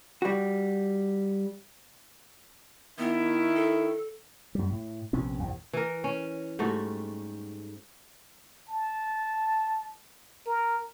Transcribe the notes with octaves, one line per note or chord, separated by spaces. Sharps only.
G3 F#4
D#3 B3 E4
A4
F#2 G3
A2
A#1 C3 B3 C#4
A#1 E2 G2
E3 A#4
C#4
G#2 G3 A3 F#4
A5
A#4